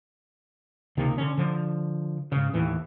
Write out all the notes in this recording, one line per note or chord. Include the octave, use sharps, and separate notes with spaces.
C#2 C3 D#3 A#3
D3 C#4
D3 F3
G#2 C#3
D#2 A2 E3